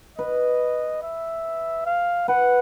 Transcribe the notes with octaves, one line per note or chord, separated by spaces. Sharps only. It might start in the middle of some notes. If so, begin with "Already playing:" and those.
B4 D#5
E5
F5
B4 F#5